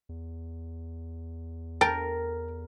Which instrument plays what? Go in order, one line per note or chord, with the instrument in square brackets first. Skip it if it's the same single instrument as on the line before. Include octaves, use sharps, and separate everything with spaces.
[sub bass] E2
[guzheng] A#4 [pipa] G5 A5